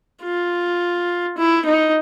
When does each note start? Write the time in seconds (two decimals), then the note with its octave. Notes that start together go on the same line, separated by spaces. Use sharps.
0.23 F4
1.38 E4
1.66 D#4